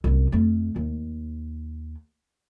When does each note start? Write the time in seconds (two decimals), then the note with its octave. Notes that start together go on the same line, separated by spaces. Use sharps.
0.04 C2 F#2
0.32 F2 A3
0.76 D#2